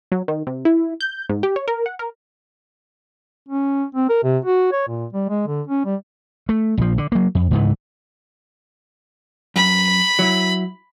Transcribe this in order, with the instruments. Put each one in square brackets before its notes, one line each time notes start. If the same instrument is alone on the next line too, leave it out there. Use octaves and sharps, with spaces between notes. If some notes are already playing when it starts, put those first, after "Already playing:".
[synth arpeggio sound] F#3
D#3
C3
E4
G6
G#2
G4
C#5
A#4
F#5
A#4
[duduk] C#4
C4
A#4
C3
F#4
C#5
A#2
G3
G#3
D3
C#4
G3
[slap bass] A3
A#1 F3
D3
F#3 A#3
F2
C#2 G#2 E3
[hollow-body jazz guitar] F#2 [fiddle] B5
[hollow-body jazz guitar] F#3 E4